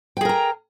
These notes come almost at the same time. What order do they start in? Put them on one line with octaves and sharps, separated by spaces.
G5 G#4 A#4 A#5